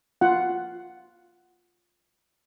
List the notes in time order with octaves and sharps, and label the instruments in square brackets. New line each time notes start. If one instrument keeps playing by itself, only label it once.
[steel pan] F4 F#5